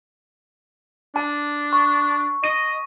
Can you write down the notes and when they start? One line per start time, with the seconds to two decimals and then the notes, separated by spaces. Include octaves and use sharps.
1.16 D4 A5
1.73 C#6
2.44 D#5 D#7